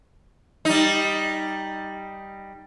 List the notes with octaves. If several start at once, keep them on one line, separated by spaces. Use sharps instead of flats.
G3 D#4